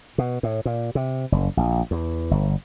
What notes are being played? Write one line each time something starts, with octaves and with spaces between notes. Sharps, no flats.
B2
A2
A#2
C3
F#1
A#1
E2
G1